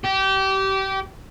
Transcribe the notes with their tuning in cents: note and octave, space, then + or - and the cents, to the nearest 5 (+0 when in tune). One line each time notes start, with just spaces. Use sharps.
G4 -25